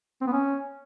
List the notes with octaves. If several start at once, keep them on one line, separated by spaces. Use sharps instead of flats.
C4
B3
C#4